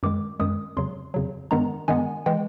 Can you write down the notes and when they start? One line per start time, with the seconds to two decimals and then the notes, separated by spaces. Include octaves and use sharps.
0.03 F#2 D#3 G#3 D6
0.40 F#2 D#3 G#3 D#6
0.77 F2 C#3 F#3 C6
1.14 F2 C#3 F#3
1.51 G2 D#3 G#3 B3 A#5
1.88 G2 D#3 G#3 B3 G#5
2.26 E3 G#3 G5